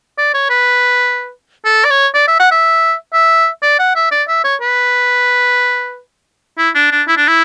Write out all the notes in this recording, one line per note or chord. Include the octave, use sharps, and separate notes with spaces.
D5
C#5
B4
A4
D5
C#5
D5
E5
F#5
E5
E5
D5
F#5
E5
D5
E5
C#5
B4
E4
D4
D4
E4
D4
E4